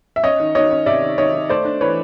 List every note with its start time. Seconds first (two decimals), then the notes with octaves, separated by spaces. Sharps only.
0.16 E5
0.24 C#4 C#5 D#5
0.40 D#3
0.55 D#3 C#5 D#5
0.71 C#4
0.86 C3 D5 E5
1.02 D#3
1.18 D#3 C#5 D#5
1.34 D#3
1.49 A3 C5 D5
1.65 D4
1.81 E3 B4 C#5